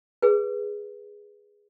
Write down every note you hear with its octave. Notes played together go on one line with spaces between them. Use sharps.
G#4 B4